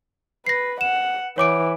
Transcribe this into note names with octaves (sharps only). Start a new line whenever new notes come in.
B4 A#6 C7
F#5 E7
E3 C#5 D6 D7